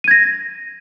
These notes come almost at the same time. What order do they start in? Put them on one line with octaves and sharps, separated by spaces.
D#7 G#6 A#6